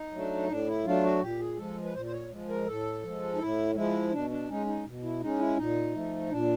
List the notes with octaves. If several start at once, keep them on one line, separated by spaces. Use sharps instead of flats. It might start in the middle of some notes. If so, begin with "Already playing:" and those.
Already playing: D#4
F#3 A3 D4
A2 D4
E4
F#3 A3 D4 F4
F#4
A#2 G4
G#4
F3 G#3 A4
B4
A#2 C5
C5
C#5
F3 G#3
A#4
A2 A4
F3 G#3
D#4
A2 E4
F3 G#3 E4
B2 D4
D4
G#3 C#4 D#4
D#4
B2
E4
G#3 C#4 D#4
E4
A#2 D#4
F3 A3
A#2 D4